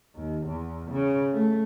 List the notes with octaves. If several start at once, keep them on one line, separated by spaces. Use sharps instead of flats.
D#2
E2
C#3
A3